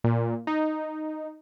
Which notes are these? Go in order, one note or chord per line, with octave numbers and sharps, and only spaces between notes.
A#2
D#4